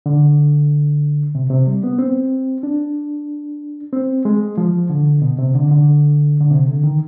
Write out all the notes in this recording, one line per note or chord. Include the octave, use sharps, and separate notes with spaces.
D3
C3
C3
G3
B3
C4
D4
C4
G#3
F3
D3
B2
C3
D3
D3
D3
C3
D3
D#3